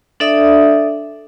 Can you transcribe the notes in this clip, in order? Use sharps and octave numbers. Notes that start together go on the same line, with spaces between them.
D4 A4 D5 E5 D#6